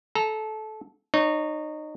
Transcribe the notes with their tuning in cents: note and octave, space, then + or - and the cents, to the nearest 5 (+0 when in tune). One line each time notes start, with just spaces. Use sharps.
A4 -20 A#5 -10
D#4 -25 C#5 +0